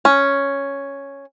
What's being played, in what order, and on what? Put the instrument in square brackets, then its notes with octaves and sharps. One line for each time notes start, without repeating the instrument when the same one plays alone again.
[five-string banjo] C#4